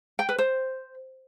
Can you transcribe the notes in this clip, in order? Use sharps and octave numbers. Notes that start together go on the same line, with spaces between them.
G5
B4
C5